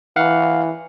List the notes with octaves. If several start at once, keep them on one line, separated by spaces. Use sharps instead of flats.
E3 F5 F#5